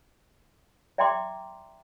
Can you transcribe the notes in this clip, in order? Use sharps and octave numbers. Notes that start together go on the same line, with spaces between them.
D5 E5 G5 A#5 C6 D6